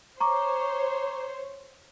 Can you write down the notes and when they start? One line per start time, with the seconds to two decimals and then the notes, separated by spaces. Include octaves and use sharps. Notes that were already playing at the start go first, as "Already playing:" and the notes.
0.20 C5 C#5 A#5 C#6 D6